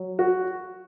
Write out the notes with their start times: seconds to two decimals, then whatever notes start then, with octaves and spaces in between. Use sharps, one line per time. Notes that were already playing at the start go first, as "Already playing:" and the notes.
Already playing: F#3
0.19 F#4